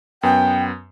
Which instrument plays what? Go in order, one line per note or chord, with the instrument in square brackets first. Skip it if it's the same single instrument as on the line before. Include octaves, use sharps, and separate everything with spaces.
[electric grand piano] F#2 B3 [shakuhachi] G5